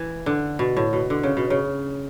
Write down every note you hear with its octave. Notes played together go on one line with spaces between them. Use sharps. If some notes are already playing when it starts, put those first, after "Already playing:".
Already playing: E3
D3
B2
A2
B2
D3
C#3
B2
C#3